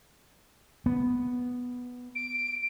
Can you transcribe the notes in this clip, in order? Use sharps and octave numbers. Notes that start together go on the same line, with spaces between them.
B3
D7